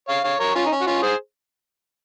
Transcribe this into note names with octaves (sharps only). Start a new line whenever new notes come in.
C#5 F5
C#5 F5
A#4 C#5
C#4 F4
D#4
C#4
F#4
C#4 F4
G#4 C5